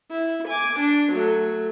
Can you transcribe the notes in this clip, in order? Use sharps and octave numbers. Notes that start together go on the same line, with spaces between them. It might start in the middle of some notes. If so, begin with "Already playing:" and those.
E4
G#5 D6
D4
F#3 A3